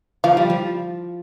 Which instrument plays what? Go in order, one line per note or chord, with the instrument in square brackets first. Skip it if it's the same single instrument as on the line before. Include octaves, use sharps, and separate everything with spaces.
[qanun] F3 [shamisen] F5
[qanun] G3
F3